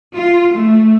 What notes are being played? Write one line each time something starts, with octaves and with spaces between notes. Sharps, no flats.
F4
A3